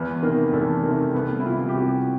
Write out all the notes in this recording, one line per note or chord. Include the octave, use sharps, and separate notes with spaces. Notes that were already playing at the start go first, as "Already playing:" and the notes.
Already playing: E2 B3
C3 D#3 A#3
E2 A3
C3 D#3 A#3
C2 B3
E4
C3 E3 F4
G4
C2 F#4